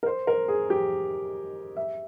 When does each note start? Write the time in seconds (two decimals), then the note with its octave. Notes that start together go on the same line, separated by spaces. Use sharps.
0.03 A#4
0.06 C5
0.27 A#4
0.48 G#4
0.70 G4
1.77 E5